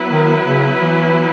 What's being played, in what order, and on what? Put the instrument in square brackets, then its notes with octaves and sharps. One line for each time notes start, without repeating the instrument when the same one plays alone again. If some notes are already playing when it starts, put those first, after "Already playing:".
Already playing: [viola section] F#3 B3 E4 B4
[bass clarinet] D#3
C#3
E3